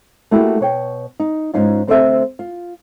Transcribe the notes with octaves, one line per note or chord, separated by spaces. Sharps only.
A3 A#3 E4 F#4 G4
B2 C#5 G5
D#4
G#2 C#4 D#4 F4
D2 C4 A4 C5 C#5 E5
F4